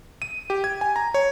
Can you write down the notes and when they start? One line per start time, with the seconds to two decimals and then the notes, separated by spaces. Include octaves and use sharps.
0.22 D#7
0.50 G4
0.64 G#6
0.81 G#5
0.96 A#5
1.14 C#5